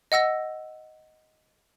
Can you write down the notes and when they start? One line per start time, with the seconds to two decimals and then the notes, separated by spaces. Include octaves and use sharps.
0.12 D#5 F#5 E6 A#6